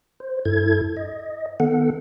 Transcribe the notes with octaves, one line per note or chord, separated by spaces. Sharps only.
C5
G2 E4 A4 G#6
D#5
D#3 B3 A4 F#5